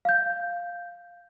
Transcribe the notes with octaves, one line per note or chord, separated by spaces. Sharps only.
F5 G6